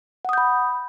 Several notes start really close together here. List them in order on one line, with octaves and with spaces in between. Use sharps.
F#5 D#6 G6 B5